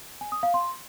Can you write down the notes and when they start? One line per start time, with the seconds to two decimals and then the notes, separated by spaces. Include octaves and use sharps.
0.21 G#5
0.32 D#6
0.43 F5
0.54 C6